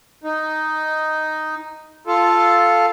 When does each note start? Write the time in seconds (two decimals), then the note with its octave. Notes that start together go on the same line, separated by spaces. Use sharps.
0.24 D#4
2.07 F4 A4